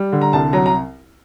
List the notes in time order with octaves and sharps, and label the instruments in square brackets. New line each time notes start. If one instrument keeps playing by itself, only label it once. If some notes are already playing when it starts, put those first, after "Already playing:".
Already playing: [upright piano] G3
D3
A#5
C2 A5
F#3 A#5
A#5